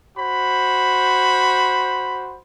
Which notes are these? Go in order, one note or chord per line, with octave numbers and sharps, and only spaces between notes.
F#4 C5 B5